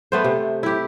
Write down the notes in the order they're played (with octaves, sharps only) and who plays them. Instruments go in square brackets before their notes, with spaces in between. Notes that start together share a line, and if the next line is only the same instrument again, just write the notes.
[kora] A3 B3 C5
C3
E4 G4